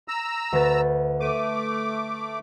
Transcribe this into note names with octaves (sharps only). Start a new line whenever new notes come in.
A#5 E6
D2 B4 A6
A3 D6 D#7